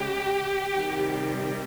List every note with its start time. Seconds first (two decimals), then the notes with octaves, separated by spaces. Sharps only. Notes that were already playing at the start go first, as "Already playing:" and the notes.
Already playing: C#3 G#3 G4
0.73 C3 D#3 G3